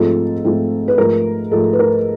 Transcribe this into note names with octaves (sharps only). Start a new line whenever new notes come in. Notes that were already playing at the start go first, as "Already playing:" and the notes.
Already playing: G#2 F3 A3 C4 F4 A4
G#2 F3 A3 C4 F4
B4
G#2 F3 A3 A#4
G#2 F3 A3 A4
B4
A#4